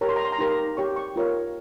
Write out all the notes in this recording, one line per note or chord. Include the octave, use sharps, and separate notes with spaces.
G4 A#4 C#5 A#5
C6
A#5
C6
A#5
D#4 G4 A#4 C6
A#5
G4 C#5 C#6
C#6
F4 A#4 C#5